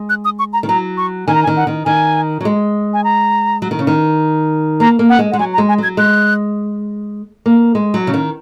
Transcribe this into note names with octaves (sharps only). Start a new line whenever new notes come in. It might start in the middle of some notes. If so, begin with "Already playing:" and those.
Already playing: G#3
F#6
D#6
C#6
A#5
D#3
F#3 A#5
C#6
D#3 G#5
A#5
G#5
D#3
F#5
D#3
D#3 G#5
F#3
G#3
G#5
A#5
F#3
D#3
C#3
D#3
A#3 A#5
A#3
F#5
G#3
G#3 F#5
F#3 G#5
A#5
G#3
G#5
F#3 G#6
G#3 F#6
A#3
G#3
F#3
C#3
D#3